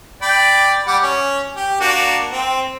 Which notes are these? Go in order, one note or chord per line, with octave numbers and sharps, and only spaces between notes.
D5 G5 B5
G3 F#5 D6
C#4
G4
A#3 D4 F#4
C4